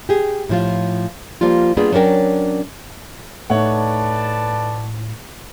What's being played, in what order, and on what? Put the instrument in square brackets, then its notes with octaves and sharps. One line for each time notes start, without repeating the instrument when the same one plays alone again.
[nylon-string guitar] G4 G#4
A2 F3 F4
F3 G3 A#3 F4
G3 A#3 B3 D4 F4 G#4
F#3 C#4 D4 A#4 G5
[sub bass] A2 [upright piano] A3 D#4 [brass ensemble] B4 D5 A5 [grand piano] C#5 F#5